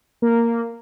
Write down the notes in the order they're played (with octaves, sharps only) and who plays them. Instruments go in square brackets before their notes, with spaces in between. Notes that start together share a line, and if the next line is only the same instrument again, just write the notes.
[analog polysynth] A#3